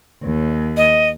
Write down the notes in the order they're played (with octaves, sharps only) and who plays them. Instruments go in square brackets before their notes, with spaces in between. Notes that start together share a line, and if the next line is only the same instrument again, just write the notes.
[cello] D#2
[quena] D#5